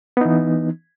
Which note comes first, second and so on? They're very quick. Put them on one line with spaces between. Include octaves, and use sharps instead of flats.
B3 D#4 E3